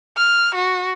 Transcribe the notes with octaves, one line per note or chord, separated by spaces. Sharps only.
F6
F#4